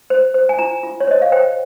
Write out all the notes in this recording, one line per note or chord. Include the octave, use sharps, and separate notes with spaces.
C5
C5
G#5
F4 A#5
F4
C#5
C5 D#5
F5
C5 G5